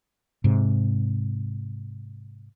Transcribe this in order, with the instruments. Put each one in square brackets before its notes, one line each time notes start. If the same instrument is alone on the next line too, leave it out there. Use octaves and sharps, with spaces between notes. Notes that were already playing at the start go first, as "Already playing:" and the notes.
[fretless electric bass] G#2 C3